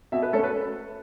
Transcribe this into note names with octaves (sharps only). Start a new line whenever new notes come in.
B2 E5
B4
A3 C#4 A4
B4